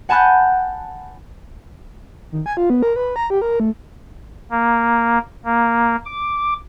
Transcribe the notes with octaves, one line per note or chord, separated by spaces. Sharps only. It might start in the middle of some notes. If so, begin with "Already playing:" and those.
F#5 G#5 A5 B5 F#6 G6
D#3
G#5
F4
B3
A#4
B4
A#5
G4
A#4
A3
A#3
A#3
D6